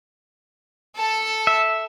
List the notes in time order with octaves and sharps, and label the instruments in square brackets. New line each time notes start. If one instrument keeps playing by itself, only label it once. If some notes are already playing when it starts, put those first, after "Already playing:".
[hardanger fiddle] A4 A5
[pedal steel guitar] E5